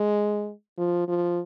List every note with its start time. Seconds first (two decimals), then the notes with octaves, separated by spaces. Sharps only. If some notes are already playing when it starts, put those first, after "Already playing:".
Already playing: G#3
0.78 F3
1.08 F3